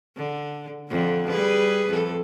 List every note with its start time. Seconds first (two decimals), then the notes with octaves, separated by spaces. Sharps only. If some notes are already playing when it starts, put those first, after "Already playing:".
0.16 D3
0.89 F2 D3
1.29 G3 G#4 B4
1.89 F2 A4